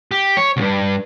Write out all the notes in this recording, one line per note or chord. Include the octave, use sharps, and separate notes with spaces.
G4
C#5
C2 G2